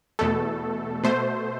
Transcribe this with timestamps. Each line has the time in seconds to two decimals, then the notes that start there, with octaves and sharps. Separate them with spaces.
0.19 E2 B2 A3 A4
1.03 B2 A3 C5